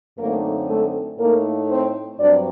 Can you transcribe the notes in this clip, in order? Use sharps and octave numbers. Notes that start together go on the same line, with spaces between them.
F#2 D3 A3 A#3 C4 D#4 A#4
A3 A4
A2 A3 A#3 D#4 A#4
C4 C5
G2 F#3 C4 D4 D5